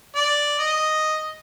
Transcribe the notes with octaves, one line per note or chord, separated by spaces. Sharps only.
D5
D#5